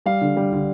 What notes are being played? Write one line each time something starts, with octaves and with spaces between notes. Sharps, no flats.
G3 F5
D3
G3
D3